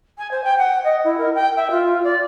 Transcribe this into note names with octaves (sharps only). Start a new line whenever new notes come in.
G#5
C5
G5
F#5
D#5
E4
A#4
G5
E5
F4
D5